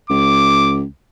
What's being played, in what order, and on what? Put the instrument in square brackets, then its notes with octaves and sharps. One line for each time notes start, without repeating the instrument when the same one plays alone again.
[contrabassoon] C#2 [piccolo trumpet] D6